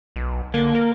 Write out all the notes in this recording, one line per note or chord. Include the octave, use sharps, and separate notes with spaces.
B1
D3 A#3
A#4